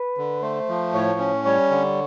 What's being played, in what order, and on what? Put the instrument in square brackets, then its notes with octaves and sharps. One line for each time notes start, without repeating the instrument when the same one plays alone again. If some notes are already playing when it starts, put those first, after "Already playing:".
Already playing: [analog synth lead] B4
[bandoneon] D3
[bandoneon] A3 [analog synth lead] C5
[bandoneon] F3
[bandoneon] A2 [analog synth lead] C#5
[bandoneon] C#4
[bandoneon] G3 [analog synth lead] C#5
[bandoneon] D3